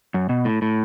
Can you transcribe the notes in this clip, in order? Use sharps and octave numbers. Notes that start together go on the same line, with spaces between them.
F#2
B2
A2
A2